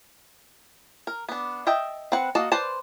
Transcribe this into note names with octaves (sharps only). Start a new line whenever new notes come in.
A#4
B3 D4
D#5 E5 G5 A5
C4 B4 F#5
A#3 F#4 D#5 A5
B4 C5 D5 A5